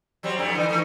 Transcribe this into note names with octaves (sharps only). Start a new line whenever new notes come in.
F#3 G3 C4
F2 G3 A3
D3 E3 D#4
E3 A3 D#4